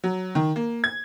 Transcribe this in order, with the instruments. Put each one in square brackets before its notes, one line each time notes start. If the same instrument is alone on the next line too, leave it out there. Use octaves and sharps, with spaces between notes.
[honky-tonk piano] F#3
D#3
A#3
G#6